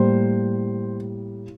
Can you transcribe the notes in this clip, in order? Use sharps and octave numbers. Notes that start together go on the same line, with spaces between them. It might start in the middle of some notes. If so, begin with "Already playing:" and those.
Already playing: A2 G3 A#3 C5